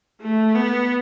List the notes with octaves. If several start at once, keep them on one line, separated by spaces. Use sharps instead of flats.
A3
B3